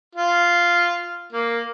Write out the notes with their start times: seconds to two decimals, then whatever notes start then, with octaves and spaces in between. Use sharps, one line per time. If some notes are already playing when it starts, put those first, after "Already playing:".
0.15 F4
1.33 A#3